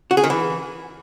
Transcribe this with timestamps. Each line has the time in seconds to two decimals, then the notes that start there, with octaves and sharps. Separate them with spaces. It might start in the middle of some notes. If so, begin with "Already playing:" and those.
0.11 F#4
0.17 G#4
0.24 D#3
0.30 E3